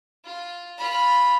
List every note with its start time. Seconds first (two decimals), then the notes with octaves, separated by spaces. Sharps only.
0.25 F4
0.77 F4 B5